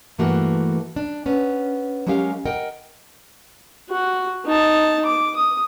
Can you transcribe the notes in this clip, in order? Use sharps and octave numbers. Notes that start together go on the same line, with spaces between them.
G2 E3 A3 A#3 F#4
D4
B3 C#4
F#3 G#3 C#4 G4 A#4 F5
A#4 D#5 F#5 G5
F#4
D#4 A5
D6
D#6